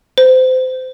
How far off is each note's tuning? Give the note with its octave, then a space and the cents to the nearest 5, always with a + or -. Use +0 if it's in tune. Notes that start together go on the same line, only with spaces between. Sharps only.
C5 -25